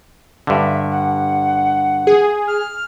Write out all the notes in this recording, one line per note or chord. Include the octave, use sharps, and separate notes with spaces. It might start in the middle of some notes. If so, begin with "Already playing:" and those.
G2 D3 E5
F#5
G#4
F6